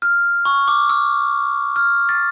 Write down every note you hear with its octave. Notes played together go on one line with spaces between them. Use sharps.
F6
C#6
D6
E6
F6
A6